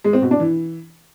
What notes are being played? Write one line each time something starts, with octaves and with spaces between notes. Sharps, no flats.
G#3
C4
B2
D4
E3